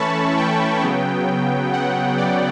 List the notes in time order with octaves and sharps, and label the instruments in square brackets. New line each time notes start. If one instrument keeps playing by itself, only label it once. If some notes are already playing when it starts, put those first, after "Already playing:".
Already playing: [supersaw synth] E3 A3 C#4 A5 B5 C#6
G5
C#3 F#3 B3
F#5
D5